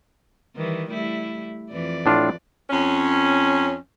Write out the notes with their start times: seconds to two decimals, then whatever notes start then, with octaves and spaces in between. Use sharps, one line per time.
0.56 D#3 E3 G3
0.89 G3 A3 E4
1.71 F2 E3 D5
2.06 A2 D4 F4
2.70 F2 C#4